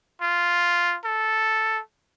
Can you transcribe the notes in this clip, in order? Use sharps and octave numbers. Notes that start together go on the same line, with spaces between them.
F4
A4